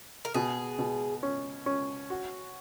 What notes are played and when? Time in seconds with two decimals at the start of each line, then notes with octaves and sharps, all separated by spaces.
0.25 A#4
0.34 B2 G#4
0.79 B2
1.23 C#4
1.66 C#4
2.10 F#4